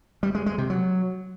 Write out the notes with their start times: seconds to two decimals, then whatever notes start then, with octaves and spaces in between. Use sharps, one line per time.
0.23 G3
0.35 G#3
0.46 G#3
0.58 C3
0.70 F#3